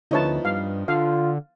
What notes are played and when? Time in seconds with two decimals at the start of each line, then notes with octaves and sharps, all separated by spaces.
0.11 D2 F3 B3 D#4 E4 C#5 A5
0.45 G2 F5
0.88 D3 F4 F5